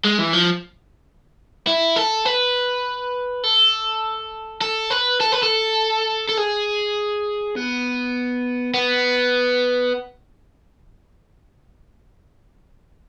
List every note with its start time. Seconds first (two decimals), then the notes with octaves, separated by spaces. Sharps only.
0.05 G#3
0.19 E3
0.34 F3
1.67 E4
1.96 A4
2.25 B4
3.44 A4
4.62 A4
4.91 B4
5.21 A4
5.33 B4
5.43 A4
6.29 A4
6.38 G#4
7.56 B3
8.74 B3